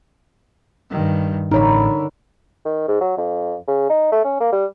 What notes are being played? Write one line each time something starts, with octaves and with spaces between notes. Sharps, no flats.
G2 D#3
A1 D3 D#4 A#4 C#5 B5
D#3
G#2
F#3
F2
C#3
D#4
A3
C#4
A#3
G3